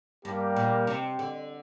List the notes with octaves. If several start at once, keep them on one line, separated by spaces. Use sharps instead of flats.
G2 G3 A#3 G4
A#2
C3
D3